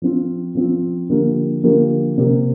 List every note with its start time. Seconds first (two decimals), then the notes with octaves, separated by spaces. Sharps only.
0.02 F3 C4 F4
0.55 F3 C4 F4
1.10 D3 F3 A#3 G4 A#4
1.63 D3 F3 A#3 G4 A#4
2.18 C3 A#3 G4 A#4